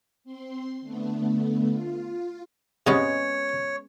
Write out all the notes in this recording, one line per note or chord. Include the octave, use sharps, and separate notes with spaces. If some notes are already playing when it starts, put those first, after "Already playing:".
C4 C6
D3 A3 B3
F4
G#2 C3 G#3 B3 C#4 C#5